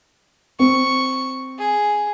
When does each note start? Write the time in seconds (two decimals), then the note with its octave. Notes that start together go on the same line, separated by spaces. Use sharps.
0.59 C4 C#6
1.58 G#4